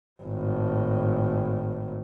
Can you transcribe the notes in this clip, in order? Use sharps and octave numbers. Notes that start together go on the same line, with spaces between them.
G#1 A2